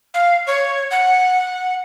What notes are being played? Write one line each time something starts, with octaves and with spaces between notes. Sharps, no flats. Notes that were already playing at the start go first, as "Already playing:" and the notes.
F5
C#5
F#5